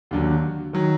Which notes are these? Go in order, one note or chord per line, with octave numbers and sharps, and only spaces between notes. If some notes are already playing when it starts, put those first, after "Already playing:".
D#2 D3 F#3
D#3 F#3